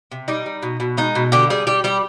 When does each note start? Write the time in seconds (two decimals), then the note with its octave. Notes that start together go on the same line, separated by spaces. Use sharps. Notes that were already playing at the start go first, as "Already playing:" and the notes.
0.12 C3
0.28 G3 D#4
0.46 G3
0.62 B2
0.80 B2
0.97 G#3 D#4
1.15 B2
1.32 D3 G4
1.50 G3 G#4
1.67 G3 G4
1.84 G3 G4